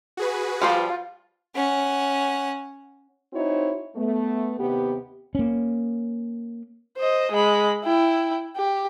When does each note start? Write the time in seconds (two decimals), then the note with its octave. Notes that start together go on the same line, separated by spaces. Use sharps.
0.17 F#4 G#4 B4
0.62 F3 G3 F4 C5
1.55 C#4 F#5
3.33 C4 D#4 E4 F#4 C5 C#5
3.95 A3 B3
4.58 D#2 C3 B3 G4
5.35 A#3 C#4
6.98 C5 D#5
7.32 G#3 B5
7.84 E4 G5
8.57 G4